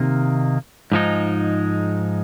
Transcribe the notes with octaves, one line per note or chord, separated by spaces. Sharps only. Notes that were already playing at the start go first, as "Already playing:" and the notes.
Already playing: C3 D#3 A#3
G#2 F3 G#3 D#4